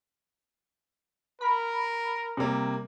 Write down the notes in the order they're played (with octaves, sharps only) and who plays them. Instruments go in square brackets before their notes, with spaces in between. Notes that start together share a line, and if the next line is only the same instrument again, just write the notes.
[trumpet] A#4 [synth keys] B5
[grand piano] C3 G3 A#3